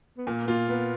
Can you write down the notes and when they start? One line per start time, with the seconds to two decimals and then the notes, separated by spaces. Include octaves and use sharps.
0.18 B3
0.27 A#2 A#3
0.47 A#3 F4
0.69 A#3 B3